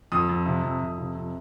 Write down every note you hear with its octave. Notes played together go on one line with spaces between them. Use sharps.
F2 D#6
F2
C3
F2
F2
C3
F2